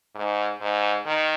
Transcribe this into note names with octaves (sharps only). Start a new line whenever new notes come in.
G#2
G#2
D#3